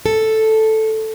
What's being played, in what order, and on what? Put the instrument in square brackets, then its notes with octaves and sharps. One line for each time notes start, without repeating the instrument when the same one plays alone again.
[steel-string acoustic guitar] A4